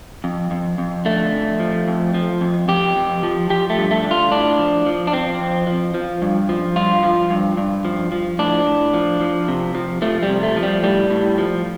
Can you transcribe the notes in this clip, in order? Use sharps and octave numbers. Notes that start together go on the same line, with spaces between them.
F2
F2
F2
D3 A3
F2
F3
F2
F3
F2
F2 G4
F2
F3
F3 G4
A3
G2
A3
D3
F4
A2 D4
F3
F3
D4
F3 C4
F2
F3
F3
G2
F3
G2 F4
F3
G2
G2
F3
F3
A2 D4
A2
F3
F3
C3
F3
F3 A3
G3
C3
A3
F3
G3
A2 G3
A2
F3